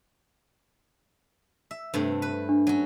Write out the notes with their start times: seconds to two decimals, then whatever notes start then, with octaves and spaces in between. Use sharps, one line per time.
1.71 E5
1.94 G2 C3 A3
2.22 B4
2.49 D4
2.67 F#3 C#4